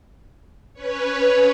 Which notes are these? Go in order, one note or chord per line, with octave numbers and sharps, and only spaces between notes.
C#4 B4 C#5